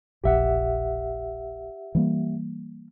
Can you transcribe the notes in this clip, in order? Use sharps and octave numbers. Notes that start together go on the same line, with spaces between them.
E1 A#1 G4 E5 F#5
E3 G3 A#3